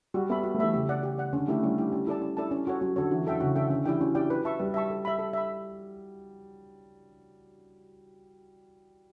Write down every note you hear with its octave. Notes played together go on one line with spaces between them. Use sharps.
G3 F#4
B3 A4 E5 B5
F#4
A3
E3 A4 E5 B5
C#3 G4
D5 F#5
G4
D5 F#5
D3 C#4
A3 E4 G4
G3 C#4
E4 G4
C#4
E4 A4 D5 A5
C#4
E4 A4 D5 A5
C#4
F#4 A4 C#5
F#3 C#4
D3 F#4 A4 C#5
E3 F#4
F#3
D3 A4 E5 G5
C#3 F#4
D3 A4 E5 G5
D3 C#4
E3 E4 G4 D5 G5
F#3 C#4
E4 G4 D5 G5
B4
E5 A5 C#6
G3 B4
E5 A5 C#6
A4
E5 B5
A4
E5 B5